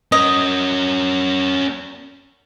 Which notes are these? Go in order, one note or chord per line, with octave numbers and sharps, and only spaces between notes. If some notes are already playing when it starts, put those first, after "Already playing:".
C#4 A#4 D#5